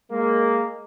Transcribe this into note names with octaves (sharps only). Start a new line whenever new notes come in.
G#3 A#3